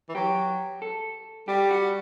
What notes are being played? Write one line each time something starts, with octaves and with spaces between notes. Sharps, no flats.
E3
F#3 G4
A4
G3 G4
F#4